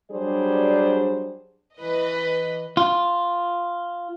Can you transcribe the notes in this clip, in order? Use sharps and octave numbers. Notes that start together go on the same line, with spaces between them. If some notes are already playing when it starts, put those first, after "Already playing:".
F#3 G3 D4 G#4 C5 D5
E3 B4 D#5
F4